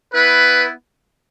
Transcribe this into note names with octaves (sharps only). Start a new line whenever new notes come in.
B3 E4 B4